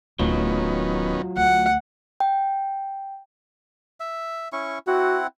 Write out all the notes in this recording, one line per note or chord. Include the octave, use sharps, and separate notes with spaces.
D1 D#3 F#3 B3 C#4 F4
D2 F#5
G5
E5
C#4 E4 C#6
C4 E4 F#4 F#5